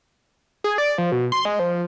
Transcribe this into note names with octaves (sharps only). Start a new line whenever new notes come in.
G#4
D5
F3
B2
C6
G#3
F3